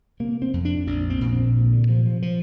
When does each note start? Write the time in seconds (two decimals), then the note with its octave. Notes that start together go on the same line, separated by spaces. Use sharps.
0.20 C3 A#3
0.42 C4
0.54 F2
0.65 D4
0.87 A#1 D4
1.10 C4
1.21 A#2
1.32 C4
1.55 D2
1.73 D3
1.89 C3 F3
2.06 F3
2.22 F3